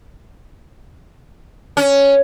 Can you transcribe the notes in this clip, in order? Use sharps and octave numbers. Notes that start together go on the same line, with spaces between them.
C#4